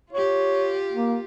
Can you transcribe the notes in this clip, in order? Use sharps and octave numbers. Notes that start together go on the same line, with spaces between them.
F4 G4 C#5
A#3